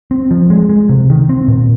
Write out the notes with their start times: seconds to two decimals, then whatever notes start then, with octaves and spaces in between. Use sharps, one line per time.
0.11 C4
0.31 F3
0.50 G#3
0.69 G#3
0.89 C3
1.10 D#3
1.29 C4
1.48 A#2